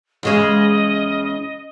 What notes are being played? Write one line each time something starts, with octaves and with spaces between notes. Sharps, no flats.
E2 C#3 G#3 D#5